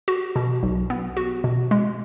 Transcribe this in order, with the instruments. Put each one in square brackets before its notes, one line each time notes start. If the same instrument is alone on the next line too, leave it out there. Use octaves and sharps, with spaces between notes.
[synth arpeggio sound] F#4
B2
B1
B3
F#4
B2
G#3